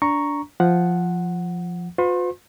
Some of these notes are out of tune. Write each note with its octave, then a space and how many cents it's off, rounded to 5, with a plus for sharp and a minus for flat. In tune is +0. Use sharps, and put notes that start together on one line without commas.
D4 -15 A#5 +0 C#6 +0
F3 +0 F#5 +0
F4 +45 B4 +45 C6 +45